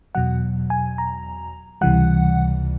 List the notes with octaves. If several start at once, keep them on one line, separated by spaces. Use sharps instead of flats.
E2 B2 F#3 F#5
G#5
A#5
C#2 C3 E3 G3 F#5